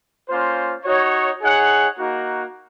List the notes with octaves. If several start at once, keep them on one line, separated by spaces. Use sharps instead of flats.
A#3 C#4 F4 C5
D#4 F#4 C#5
D#4 G#4 C#5 F#5
A#3 D#4 F#4